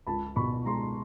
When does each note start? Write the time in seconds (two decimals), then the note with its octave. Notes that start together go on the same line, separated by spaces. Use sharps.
0.07 C#2 A5 B5
0.36 B2 B5 C#6
0.66 G#3 A#5 C6